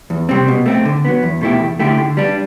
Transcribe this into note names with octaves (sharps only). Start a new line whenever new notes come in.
E2
C3 G3 C4
B2
A3 C4
D3
F#3 B3
E2
B2 A3 E4 G4
E2
D3 A3 E4 G4
D3
G3 D4